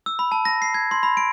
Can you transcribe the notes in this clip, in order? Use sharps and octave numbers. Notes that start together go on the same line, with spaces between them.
E6
B5
A5
A#6
C7
G#6
C6
B5
D7